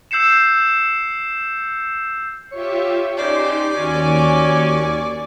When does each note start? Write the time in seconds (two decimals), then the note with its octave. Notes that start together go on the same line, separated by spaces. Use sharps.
0.11 E6 G6 C7 C#7 E7
2.52 F4 G4 C#5 E5
3.17 C#3 D#4 G4 C5 D5 C6
3.74 D#2 C#4 F#4 G#5 C#6